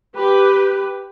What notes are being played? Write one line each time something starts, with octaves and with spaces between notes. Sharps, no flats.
G4 B4